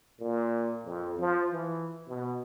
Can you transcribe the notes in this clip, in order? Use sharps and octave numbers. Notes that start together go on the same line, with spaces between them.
A#2
F2
F3
E3
B2